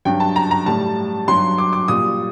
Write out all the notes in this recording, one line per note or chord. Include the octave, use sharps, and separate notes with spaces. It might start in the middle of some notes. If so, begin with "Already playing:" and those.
G2 F#3 G5
A5
A#5
A#5
A2 G3 A5
G2 F#3 C6
D6
D6
A#2 G3 D#6